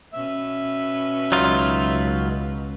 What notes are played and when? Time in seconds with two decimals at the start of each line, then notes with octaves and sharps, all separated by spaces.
0.13 B2 C#4 B4 E5
1.32 C#2 F#3 D#4 F4